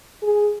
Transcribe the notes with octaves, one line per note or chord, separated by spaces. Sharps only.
G#4